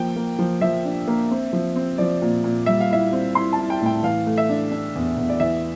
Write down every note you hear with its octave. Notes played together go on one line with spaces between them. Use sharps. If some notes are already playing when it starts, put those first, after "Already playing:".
Already playing: F3 A#3 G5
A#3
F3
F3 E5
D4
A#3
C4
F3
C4
F3 D5
A#2
A#2
G3 E5
F5
E4 E5
C4
E4 C6
A5
E4
G5
A2 G5
E3 F5
A3
E5
D4
D4
E2
E2
D5
E3 E5